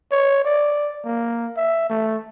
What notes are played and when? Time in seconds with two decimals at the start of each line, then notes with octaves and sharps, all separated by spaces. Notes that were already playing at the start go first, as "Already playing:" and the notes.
0.12 C#5
0.45 D5
1.05 A#3
1.57 E5
1.90 A3